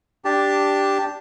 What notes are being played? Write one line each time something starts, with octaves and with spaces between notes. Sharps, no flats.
D4 G4 A5